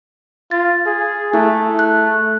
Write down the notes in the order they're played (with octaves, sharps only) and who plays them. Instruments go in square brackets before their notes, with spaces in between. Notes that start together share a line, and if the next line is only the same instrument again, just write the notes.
[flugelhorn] F4 [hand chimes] A6
[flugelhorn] G#4
[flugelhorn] A3 [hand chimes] E4
[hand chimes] F#6